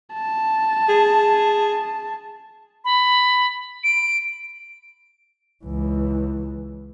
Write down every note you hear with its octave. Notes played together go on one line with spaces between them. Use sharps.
A5
G#4
B5
D7
C#2 E3